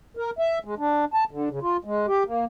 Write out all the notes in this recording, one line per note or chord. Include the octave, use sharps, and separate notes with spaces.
A#4
E5
G#3
D4
A5
D3
C#3
F4
G#3
G4
A#3